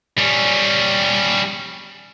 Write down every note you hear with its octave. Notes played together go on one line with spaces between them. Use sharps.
G3 C#4